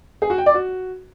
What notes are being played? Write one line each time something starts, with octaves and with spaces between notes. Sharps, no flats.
G#4
F#4
G5
D5
F#4